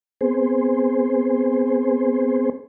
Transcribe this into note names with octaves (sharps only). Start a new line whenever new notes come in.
B3 C4 G#4 C5